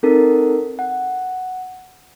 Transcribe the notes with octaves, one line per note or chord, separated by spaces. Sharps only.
C4 D#4 A4 A#4
F#5